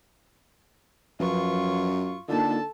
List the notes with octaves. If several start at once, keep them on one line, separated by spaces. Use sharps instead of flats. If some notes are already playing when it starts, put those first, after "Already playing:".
F#2 F3 C#4 F4 B4 C#6
D3 A#3 D#4 F4 A4 A5